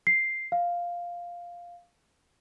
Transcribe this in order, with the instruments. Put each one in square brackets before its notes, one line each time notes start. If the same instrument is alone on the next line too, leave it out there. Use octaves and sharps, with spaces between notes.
[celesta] C7
F5